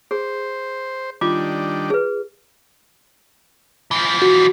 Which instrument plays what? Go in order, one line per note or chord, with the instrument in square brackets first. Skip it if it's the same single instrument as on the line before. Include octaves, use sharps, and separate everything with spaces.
[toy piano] G#4 [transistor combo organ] C5
[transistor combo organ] D#3 G3 D4 [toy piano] F4 D6
[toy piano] G#4 B4
[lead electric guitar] E3 F3
[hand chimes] F#4